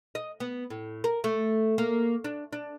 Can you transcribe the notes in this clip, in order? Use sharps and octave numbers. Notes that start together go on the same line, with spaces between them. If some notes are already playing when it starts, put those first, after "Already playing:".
D#5
B3
A2
A#4
A3
A#3
D4
D4